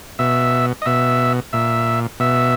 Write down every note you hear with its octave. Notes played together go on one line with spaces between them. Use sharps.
B2 E5
D#5
B2 E5
A#2 E5
B2 E5